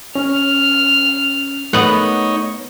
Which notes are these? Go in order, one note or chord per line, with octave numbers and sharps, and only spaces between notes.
C#4 F6
A3 B3 D#4 C#5 F#5